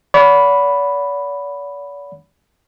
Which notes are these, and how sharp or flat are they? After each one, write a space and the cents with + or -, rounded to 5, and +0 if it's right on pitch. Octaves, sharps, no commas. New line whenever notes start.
D5 -45 F#5 -25 B5 +0